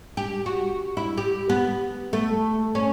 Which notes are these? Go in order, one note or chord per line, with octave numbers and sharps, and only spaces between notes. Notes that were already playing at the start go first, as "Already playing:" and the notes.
G4
F#4
E4
G4
B3
A3
C#4